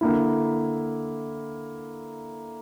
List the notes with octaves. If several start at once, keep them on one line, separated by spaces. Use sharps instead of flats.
D3 A#3 E4